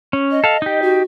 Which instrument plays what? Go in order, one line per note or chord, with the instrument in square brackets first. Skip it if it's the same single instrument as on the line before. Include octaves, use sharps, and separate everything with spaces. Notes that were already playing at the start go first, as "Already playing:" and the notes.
[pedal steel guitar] C#4
[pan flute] D#5
[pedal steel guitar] A4 F5
D#4 G4
[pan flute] F#4